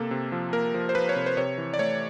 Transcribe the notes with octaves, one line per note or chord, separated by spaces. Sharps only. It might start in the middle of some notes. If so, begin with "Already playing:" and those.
Already playing: C3 A#3 A4
C3
F3
A#3 A#4
F3
C5
F3 B4
C#5
C3
C5
C3 C#5
E3
D5
A3 C#5